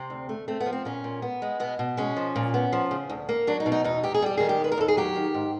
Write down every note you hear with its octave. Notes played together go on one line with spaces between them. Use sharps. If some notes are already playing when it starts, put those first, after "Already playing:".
Already playing: C3 C4
D2
A3
A3 C4
B3
F3
C4
A#2 C#4
A#2
B3
G#3
B2 B3
B2
G#3 C#4
F3
A#2
B3
F3
C#3
D2
A#3
F#3 D4
D#4
B2
D#4
E2 D#4
E2 G4
G#4
G3 G4
D#3 G#4
G4
D#2 B4
A#4
D#2 A4
G#4
F#3 G4
D#3
G#2